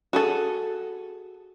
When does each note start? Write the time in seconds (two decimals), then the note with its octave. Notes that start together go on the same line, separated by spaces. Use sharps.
0.13 F#4 G#4 A4